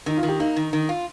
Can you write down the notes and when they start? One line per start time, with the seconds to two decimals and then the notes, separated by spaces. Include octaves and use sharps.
0.06 D#3 D#4
0.17 F4
0.23 D#3
0.28 G4
0.39 A#3 D#4
0.56 D#3
0.73 D#3
0.89 F4